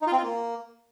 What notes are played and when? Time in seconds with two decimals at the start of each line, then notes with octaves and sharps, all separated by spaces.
0.02 D#4
0.07 F4
0.12 C4
0.17 F4
0.23 A#3